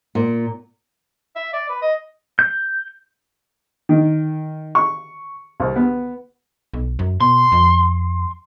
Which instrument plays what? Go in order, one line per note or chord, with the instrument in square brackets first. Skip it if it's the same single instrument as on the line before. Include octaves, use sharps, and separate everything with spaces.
[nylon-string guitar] A#2
[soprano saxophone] E5
D5
B4
D#5
[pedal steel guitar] G6
[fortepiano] D#3
C#6
C2
B3
[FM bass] B1
F#2
[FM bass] B2 [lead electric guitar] C6
[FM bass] F2